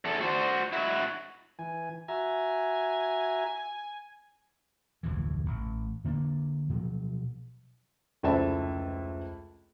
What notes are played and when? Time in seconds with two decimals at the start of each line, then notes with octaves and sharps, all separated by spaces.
0.05 E2 A4
0.21 F#4 C5
0.72 E4 F#4
1.59 E3 G#5
2.08 F#4 E5 G#5 A#5
5.03 F1 D2 A2 E3
5.46 A1
6.04 D3 A#3 C4 D4
6.69 B2 F3 F#3
8.23 F1 C#2 E4 C5 E5 A5